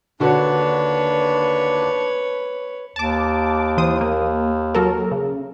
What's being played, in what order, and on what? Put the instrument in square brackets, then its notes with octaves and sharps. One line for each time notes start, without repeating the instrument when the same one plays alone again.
[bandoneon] D#2 D4 [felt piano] D3 F#4 [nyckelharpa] B4 C#5
[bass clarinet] D#2 [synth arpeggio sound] A5 D6
[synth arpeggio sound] E3 C5 D#6
A#3
F#3 A4 A#4
C#3